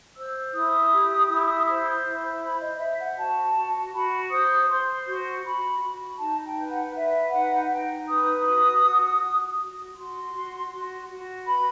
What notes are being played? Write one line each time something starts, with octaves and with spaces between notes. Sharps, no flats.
C5 E6
E4 D#6
G4
E4
C5
E4
C5 B5
D#5
C5 E5
F#5
F#4 A5
F#4
F#4 B5
C5 D#6
C5 C6
F#4 C6
F#4 B5
F#4
D#4 A5
G5
B4
F#5
B4 E5
D#4 F#5
D#4 G5
B4 D#6
F#4
F#4
F#4
F#4
F#4 C6
F#4
F#4
F#4
B4 B5